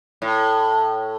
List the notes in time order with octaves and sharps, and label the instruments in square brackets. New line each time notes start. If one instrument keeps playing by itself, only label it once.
[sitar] A2